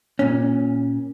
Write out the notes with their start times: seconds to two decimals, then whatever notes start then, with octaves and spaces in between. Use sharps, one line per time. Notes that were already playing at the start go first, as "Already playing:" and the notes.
0.19 A#2 C#4